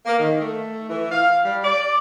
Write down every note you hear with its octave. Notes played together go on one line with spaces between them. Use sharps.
A#3
D#3
A3
E3
F5
G3
D5